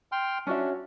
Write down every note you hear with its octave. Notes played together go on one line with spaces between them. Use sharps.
G5 C6 F6
C#4 D4 F#4 E5